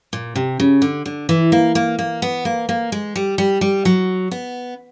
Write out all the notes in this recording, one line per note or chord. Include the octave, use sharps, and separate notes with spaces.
A#2
C3
C#3
D3
D3
E3
A#3
A#3
A#3
B3
A#3
A#3
G#3
G3
G3
G3
F#3
B3